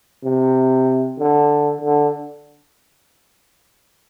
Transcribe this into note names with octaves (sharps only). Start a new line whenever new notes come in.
C3
D3
D3